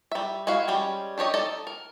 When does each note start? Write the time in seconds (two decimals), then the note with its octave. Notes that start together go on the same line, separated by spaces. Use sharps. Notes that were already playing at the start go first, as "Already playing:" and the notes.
0.11 G3 E5
0.47 G#3 E4 F#4 F5
0.68 G3 G#3 C#4
1.18 D4 G4 C#5 D#5
1.34 D#4 A4 D5 D#5 A5
1.67 A#4